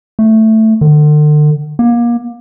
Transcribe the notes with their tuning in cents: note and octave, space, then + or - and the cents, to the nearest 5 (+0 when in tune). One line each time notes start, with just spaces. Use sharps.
A3 +5
D3 +40
A#3 +30